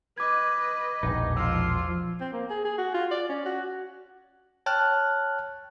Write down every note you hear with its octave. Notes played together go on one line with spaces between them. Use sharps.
B4 D#5 D6 G#6
E1 A#1 D#4
F3 F4 E6
C4
A#3
G#4
G#4
F#4
F4
D5
C#4
F#4
C#5 G5 A5 F6 F#6